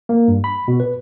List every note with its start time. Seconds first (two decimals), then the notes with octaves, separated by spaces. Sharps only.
0.09 A#3
0.28 G2
0.44 B5
0.68 B2
0.80 B4